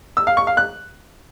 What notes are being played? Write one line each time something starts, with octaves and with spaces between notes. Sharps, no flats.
E6
F5
C#6
F5
F#6